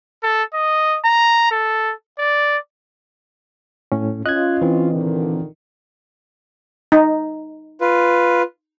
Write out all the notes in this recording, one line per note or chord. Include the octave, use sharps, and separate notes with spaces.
A4
D#5
A#5
A4
D5
A2 C#4
C#4 F4 D#5 F#6 G#6
E3 C4
A#2 D3 D#3
D#4
F4 B4